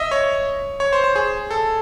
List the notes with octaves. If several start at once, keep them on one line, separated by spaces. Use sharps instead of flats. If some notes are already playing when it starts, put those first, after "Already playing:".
Already playing: D#5 E5
C#5
C#5
C5
C5
G#4
A4